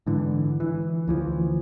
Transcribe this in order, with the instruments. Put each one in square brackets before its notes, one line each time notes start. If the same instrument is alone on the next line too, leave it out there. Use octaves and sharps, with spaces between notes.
[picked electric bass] G#2 D3 E3
E3
D2 E3 F3